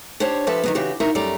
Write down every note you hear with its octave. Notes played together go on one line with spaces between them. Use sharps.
D4 G4 C5 C#5
F3 G4 A4 B4 E5
D#3 F#3 B3
C#3 E3 F#4 G4
D#4 E4 F#4 A#4 E5
F#2 G3 A3 D5 A#5